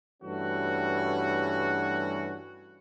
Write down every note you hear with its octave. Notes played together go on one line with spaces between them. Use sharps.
G2 E3 G3 A3 C#4 F#4